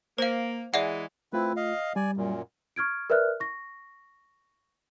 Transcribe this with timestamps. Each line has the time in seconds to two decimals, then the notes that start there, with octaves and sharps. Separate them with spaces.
0.18 A#3 C5 F5
0.74 E3 G#3 G#4 D5 E5 F#5
1.33 A3 C4 E4 F4 B4
1.56 D#5 F5
1.96 G3 D5 G#5
2.17 F#2 A#2
2.76 C#6 F6 G#6 D7
3.10 A#4 B4 D5 E5 F6 F#6
3.40 C#6 A#6